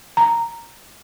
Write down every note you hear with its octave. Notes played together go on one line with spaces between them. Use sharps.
A#5